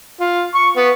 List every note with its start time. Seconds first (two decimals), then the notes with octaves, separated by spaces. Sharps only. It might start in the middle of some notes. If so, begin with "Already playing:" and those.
0.21 F4
0.55 C#6
0.77 B3